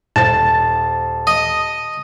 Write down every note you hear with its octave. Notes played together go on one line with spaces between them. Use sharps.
D#1 C5 A5 A6
D#5